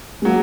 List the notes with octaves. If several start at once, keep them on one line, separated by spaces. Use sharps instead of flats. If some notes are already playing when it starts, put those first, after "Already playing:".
G#3
F#3 A#3